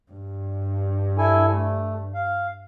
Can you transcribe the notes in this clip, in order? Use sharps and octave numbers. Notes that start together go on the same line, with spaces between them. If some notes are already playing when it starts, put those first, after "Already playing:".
G2
E4 A4 G#5
A3
F5